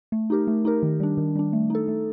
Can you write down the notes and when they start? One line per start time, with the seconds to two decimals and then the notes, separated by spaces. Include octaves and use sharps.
0.12 A3
0.30 D#4 G4 A#4
0.47 A3
0.65 D#4 G4 A#4
0.83 D#3
1.00 G3 D4
1.18 D#3
1.36 G3 D4
1.53 A3
1.70 D#4 A4
1.88 A3